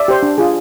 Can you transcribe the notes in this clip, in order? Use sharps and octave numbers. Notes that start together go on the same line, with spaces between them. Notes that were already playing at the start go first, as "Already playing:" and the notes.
Already playing: D5 E5
G4 C5
D4
F4 G#4